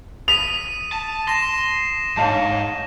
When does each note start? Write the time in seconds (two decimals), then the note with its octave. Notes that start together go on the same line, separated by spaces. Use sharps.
0.28 D#6 B6 D#7 F7
0.92 A5
1.28 C6 A#6 E7
2.17 G#2 C#5 F5 A5